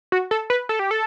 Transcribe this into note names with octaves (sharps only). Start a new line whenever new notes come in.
F#4
A4
B4
A4
G4
A4